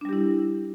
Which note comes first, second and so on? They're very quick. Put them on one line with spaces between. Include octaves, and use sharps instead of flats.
D4 G3 G4 E4